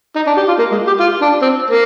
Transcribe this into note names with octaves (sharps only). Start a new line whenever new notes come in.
D#4
D4
G4
F4
A#3
G#3
G4
F4
D4
C4
A#3